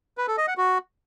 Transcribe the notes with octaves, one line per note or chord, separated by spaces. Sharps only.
B4
A4
D#5
F#5
F#4